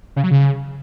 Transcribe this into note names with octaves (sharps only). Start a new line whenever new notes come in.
C#3
F#3
C#3